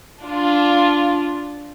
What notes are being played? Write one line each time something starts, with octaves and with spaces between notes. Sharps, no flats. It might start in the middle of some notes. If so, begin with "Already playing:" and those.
D4 F4